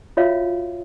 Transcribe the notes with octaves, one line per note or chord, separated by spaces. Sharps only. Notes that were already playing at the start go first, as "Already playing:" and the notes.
F4 F#4 C#5 E5 F5